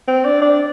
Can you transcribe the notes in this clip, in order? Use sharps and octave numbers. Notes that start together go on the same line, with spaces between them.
C4
D4
D4